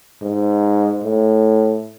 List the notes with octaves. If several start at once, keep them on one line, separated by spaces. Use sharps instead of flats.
G#2
A2